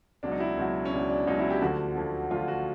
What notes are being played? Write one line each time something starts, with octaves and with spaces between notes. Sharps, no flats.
C#2 B2 F#3 D4
D#4
E4
C#2 B2 F#3
C#4
C#2 B2 F#3 D4
D4
C#2 B2 F#3 D#4
E4
G4
D2 D3 F3 F#4
D2 D3 F3
D2 D3 F3 F4
F#4